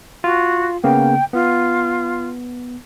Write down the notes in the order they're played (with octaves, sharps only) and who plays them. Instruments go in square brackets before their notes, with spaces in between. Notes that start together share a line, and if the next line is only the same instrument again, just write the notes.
[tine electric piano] F4 [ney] F#4
[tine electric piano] C#3 A#3 B3 [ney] G5
[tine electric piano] B3 [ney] F4